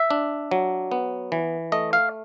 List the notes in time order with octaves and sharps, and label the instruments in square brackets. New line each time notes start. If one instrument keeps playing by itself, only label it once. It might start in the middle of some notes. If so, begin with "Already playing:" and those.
Already playing: [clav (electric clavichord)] E5
D4
F#3
B3
E3
A3 D#5
F5